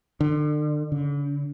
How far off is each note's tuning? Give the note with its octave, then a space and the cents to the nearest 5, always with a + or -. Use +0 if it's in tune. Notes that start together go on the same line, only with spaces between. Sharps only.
D3 +35
D3 -45